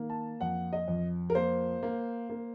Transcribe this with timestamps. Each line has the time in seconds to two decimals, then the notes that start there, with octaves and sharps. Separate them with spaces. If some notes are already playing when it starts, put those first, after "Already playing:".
Already playing: D#3 A#3
0.10 A5
0.41 F2 F#5
0.73 D#5
0.88 F2
1.30 A#4
1.35 A#3 C5
1.83 A#3
2.29 A#3